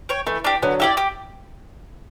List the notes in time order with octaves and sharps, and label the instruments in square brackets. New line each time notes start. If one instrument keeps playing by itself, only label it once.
[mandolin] C#5 G5
[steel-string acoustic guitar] E3 [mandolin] A3
[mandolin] D4 G4
[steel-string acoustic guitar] D3 F#3 [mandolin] B3
[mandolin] E4 G4 D5
G4